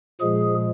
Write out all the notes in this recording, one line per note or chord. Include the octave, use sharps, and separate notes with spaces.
A#2 F3 G#3 G#4